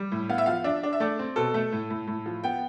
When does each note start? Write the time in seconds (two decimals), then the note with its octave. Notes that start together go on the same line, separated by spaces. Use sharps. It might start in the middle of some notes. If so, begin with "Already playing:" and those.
Already playing: G3
0.12 A2
0.29 B3 F5
0.38 E5
0.46 F3 F5
0.64 D4 E5
0.83 D4
0.93 E5
1.00 A3 D5
1.19 C4
1.36 B2 A4
1.54 A3
1.72 A2
1.90 A2
2.07 A2
2.26 F3
2.44 B3 G5